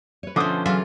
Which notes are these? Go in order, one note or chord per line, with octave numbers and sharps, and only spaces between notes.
B4 C#5
B2 D3 F3 A3 C#4 C5 D6 D#6
C#3 E3 F#3 F4 E5 F6